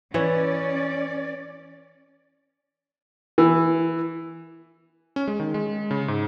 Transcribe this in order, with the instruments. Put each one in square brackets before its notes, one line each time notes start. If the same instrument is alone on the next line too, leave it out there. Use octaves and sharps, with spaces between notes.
[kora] E3 C#5 [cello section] C#4 D5
[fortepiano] E3
[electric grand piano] C#4
G#3
D#3
G#3
C#3
G#2